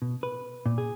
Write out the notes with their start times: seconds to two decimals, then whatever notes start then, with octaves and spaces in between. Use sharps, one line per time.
0.02 B2
0.23 B4
0.66 A#2
0.78 G#4